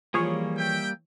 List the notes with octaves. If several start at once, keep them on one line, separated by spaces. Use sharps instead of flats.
E3 F3 G3 A#3 G#4 C#5
E5 G5